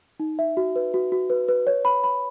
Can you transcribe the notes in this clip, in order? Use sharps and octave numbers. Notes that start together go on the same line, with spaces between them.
D#4
E5
F#4
B4
F#4
F#4
B4
B4
C#5
B5
B5